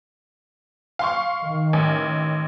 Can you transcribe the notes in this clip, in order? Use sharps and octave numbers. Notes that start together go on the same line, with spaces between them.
F5 C6 C#6
D#3
A1